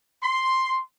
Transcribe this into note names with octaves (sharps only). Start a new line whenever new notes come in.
C6